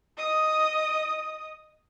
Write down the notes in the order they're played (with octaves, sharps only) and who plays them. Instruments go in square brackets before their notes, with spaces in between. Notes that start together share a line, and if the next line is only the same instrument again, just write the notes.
[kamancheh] D#5 D#6